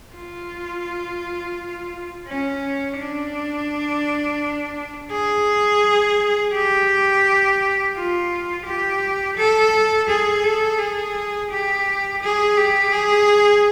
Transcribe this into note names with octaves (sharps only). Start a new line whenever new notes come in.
F4
C#4
D4
G#4
G4
F4
G4
A4
G#4
A4
G#4
G4
G#4
G4
G#4